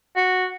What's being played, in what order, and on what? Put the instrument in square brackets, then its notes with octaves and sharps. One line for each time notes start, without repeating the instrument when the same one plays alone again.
[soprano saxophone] F#4